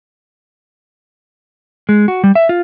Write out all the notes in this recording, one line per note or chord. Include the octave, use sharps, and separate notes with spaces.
G#3
F#4
G3
E5
F4